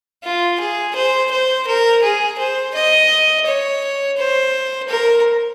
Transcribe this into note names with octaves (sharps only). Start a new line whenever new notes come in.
F4
G#4
C5
C5
A#4
G#4
C5
D#5
C#5
C5
A#4